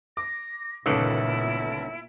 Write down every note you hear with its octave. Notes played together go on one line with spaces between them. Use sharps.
D6 A#6
G1 C#2 A#2 D#3 E3 E4 A4